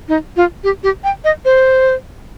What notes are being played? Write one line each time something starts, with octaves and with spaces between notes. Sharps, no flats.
D#4
F4
G4
G4
G5
D#5
C5